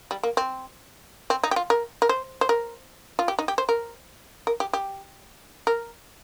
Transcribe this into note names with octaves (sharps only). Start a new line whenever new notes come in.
G3
A#3
C4
C4
D#4
G4
F4
A#4
A#4
C5
C5
A#4
F4
G4
D#4
G4
C5
A#4
A#4
G4
G4
A#4